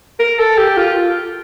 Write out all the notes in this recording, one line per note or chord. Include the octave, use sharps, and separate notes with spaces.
A#4
A4
G4
F4